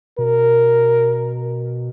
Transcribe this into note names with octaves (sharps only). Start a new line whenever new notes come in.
B2 A#4